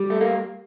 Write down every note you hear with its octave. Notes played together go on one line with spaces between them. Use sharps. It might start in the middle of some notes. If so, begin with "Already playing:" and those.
Already playing: G3
A3
A#3